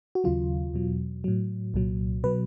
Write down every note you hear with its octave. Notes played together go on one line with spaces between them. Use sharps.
F#4
D#2 C#3 F#3 F4
E2 B2 F#3
A2 F#3
C2 A#2 F#3
B2 F#3 B4